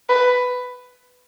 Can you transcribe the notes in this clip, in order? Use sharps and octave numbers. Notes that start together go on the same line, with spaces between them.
B4